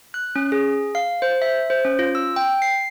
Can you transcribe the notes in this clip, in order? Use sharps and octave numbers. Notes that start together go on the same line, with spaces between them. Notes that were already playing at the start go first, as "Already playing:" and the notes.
F#6
C#4
G#4
F5
C5
E5
C5
C#4
F4
E6
G5
C7